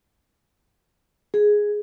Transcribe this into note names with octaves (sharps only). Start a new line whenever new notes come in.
G#4